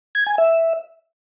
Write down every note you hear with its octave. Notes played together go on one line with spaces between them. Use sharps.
G#6
G#5
E5